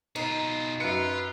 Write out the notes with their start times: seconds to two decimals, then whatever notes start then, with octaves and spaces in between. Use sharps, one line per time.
0.16 B2 D#4 F4
0.80 F#2 F4 B4 C#7